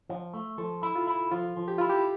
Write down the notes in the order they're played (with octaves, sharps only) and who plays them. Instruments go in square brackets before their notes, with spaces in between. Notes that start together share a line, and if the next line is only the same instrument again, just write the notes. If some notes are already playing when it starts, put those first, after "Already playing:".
[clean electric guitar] F3
A3
[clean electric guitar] F3 [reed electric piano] A4
[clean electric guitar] E4
[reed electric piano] F4
[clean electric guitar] E4
[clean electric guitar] F3 [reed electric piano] F4
[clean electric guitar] F3
[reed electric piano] G4
[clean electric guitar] E4 [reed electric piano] F4
[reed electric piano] G4